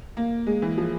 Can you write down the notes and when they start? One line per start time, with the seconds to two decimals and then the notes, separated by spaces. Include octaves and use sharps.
0.17 A#3
0.47 G#3
0.62 E3
0.78 F3